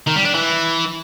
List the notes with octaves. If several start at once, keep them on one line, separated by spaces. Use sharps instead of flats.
D#3
G3
D4
E3